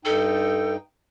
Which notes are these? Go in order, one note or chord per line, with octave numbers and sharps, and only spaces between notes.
G2 D#4 A4 G5